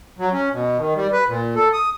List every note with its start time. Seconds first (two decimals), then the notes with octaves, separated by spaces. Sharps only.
0.19 F#3
0.33 C#4
0.52 B2
0.78 D#3
0.95 G3
1.13 B4
1.28 A#2
1.56 A4
1.73 D#6